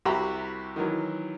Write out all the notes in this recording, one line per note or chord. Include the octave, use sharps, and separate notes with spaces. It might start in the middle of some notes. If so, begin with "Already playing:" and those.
C2 F#4 G4 E5 A#5 B5
D#3 E3 F#3